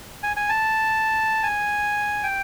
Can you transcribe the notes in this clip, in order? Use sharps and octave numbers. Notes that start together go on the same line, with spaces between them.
G#5
G#5
A5
G#5
G5